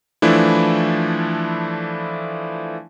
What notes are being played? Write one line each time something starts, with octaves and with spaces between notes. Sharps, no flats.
E3 F3 A3 D4 E4